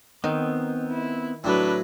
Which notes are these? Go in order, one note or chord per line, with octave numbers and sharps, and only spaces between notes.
D#3 B3 C4
E4
A2 F#3 D4 B4